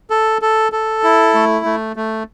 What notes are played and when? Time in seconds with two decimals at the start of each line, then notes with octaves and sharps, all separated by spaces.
0.10 A4
0.42 A4
0.72 A4
1.03 E4
1.34 A3
1.66 A3
1.96 A3